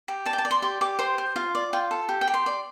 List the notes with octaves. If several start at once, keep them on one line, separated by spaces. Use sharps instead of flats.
G4
D5 A5
G5
A5
D5
C6
G4 C6
G4 D6
C5 C6
C5
F4 F5
D5
F4 G5
A4
G4
G5
G4
C6
D5